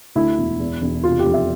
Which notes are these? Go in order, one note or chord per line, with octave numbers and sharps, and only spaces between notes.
D2 E4
E1
E2
E1
C3 F4
G4
F2
E5